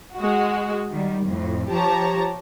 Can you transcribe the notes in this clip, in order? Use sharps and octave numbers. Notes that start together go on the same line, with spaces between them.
G#3 F#4
D#3 G3
F2 A2
F3 G4 C#5 A5 A#5